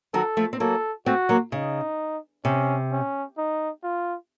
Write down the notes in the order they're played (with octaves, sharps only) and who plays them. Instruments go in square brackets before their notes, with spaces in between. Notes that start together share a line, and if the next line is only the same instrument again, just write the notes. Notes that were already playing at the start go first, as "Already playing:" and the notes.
[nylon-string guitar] D#3 F#3 [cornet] A4
[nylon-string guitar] F3 A3
C4
[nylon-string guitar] F#3 A#3 [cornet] A4
[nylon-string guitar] A3 C4 [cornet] F#4
[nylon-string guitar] F#3 A#3
[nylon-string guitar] C#3 [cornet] D#4
[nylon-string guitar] C3 [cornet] C#4
[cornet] C#4
D#4
F4